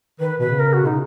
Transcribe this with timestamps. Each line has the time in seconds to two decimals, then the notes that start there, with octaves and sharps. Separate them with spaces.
0.20 D#3 B4
0.39 B2 B4
0.49 C#3
0.59 A#4
0.73 F#4
0.83 B2
0.86 D#4
0.90 C#3